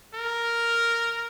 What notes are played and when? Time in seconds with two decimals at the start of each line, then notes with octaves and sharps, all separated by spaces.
0.15 A#4